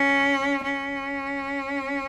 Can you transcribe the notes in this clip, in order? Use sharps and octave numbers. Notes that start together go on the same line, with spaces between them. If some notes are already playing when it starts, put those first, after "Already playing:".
Already playing: C#4
C#4